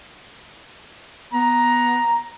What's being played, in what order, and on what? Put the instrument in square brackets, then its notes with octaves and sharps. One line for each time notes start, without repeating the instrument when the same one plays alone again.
[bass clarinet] B3 [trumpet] A#5